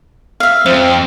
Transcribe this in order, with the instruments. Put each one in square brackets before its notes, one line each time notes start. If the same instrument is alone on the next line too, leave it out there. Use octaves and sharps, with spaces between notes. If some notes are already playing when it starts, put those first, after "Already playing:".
[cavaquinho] E5 F5
[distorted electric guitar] F2 [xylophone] C5